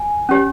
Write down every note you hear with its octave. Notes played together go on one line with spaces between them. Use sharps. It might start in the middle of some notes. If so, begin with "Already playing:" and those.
Already playing: G#5
C#4 G4 C#5